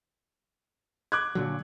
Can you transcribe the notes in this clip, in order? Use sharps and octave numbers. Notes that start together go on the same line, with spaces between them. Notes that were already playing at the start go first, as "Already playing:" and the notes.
D6 F#6 G#6
A#2 D3 F#3